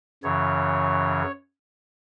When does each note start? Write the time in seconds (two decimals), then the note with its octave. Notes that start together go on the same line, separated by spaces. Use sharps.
0.23 F#2 C#3 E3 C#5